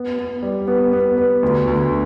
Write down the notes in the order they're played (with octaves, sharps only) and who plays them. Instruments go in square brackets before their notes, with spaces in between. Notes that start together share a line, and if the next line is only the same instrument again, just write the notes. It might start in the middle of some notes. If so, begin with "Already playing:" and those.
Already playing: [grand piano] B3
B3
G3
B3
B3
B3
D2
D2